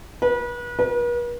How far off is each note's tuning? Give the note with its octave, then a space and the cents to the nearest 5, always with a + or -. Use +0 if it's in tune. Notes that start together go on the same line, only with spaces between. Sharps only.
B4 -35
B4 -45